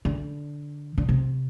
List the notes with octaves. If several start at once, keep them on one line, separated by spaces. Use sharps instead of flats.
D3
D3
C3